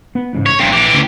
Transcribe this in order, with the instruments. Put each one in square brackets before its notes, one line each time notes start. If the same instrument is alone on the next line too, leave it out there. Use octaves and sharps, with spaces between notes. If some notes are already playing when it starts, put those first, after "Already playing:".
[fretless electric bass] B3
A1 G#2 C#3
[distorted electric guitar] C#5
[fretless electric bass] E1 A#1 [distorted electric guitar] G2 C3
[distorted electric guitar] E3 G4
[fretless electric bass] D2 C#3